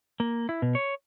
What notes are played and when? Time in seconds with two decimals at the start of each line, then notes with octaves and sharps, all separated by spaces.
0.20 A#3
0.49 E4
0.62 B2
0.75 C#5